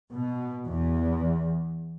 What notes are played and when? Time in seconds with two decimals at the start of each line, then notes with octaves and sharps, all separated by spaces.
0.13 B2
0.67 E2